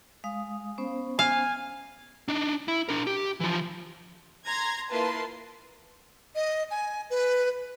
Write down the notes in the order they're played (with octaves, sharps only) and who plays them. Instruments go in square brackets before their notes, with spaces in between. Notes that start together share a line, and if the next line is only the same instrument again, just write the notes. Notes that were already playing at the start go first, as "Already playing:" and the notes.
[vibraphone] G#3 F5 D#6
B3 C#4 C5
[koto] F5 [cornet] G#5
[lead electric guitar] D4 D#4
E4
D4 A#4
G4
E3 F3
[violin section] A#5 C6 G#6 A#6
A#3 E4 F4 B4 A5 C6
[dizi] D#5
G#5
B4